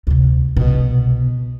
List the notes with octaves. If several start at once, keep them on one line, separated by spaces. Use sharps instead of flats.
D2 C3
C2 B2